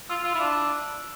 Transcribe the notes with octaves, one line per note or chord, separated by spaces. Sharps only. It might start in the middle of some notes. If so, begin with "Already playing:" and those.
F4 E6
F4 E6
E4
D4 E6